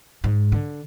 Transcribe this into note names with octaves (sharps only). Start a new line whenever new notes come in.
G#2
D3